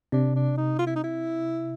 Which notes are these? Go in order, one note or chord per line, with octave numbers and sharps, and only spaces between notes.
C3 D4
D4
D#4
F4
E4
D#4
E4